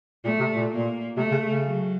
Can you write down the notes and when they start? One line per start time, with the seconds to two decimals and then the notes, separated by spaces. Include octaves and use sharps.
0.25 A#2 A3
0.40 C3
0.55 A#2
0.71 A#2 A#3
1.17 C3 A3
1.31 C#3
1.47 C#3
1.62 F#3